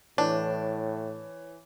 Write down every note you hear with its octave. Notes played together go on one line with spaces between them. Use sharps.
A2 E3 D4 C#5